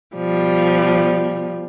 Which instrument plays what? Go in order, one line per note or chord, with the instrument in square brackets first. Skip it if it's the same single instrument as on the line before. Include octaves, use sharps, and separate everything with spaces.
[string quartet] B2 F3 G3